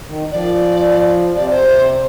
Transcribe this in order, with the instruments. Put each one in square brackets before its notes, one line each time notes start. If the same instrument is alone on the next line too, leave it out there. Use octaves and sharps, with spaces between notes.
[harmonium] D#3
[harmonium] F3 [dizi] D5
[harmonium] C3 [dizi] D5
[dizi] C5